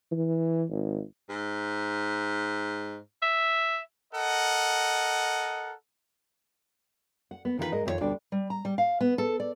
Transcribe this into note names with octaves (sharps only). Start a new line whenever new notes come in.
E3
G#1
G#2
E5
A4 A#4 D#5 F#5
F#5
B3
D#3 E3 D#4 F4 F#4 B4
G#2 G#3 G#4 A#4 D#5
F2 D#3 E4 F4 C#5
D2 B2 G3 D4 D5 G5
G3
A#5
G3
F5
B3
A4
D5